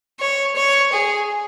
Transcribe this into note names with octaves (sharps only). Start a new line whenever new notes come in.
C#5
C#5
G#4